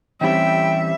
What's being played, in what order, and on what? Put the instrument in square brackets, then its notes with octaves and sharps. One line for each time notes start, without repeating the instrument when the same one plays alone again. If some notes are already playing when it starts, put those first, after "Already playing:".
[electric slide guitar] E3 C#4 [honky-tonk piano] G3 C4 [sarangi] E5 [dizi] G5